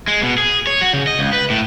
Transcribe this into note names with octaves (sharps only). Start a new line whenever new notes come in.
G#3
B2
G#4
C#5
F#4
C#3
D#5
C#2
B4
A2